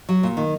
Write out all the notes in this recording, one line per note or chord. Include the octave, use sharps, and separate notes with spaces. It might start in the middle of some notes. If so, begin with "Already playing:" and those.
F#3
A#2
D#3